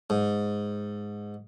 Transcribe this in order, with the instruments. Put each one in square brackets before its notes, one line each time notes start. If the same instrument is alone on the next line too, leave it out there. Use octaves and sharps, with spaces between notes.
[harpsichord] G#2